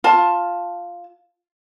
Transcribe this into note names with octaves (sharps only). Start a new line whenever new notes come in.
F4 A5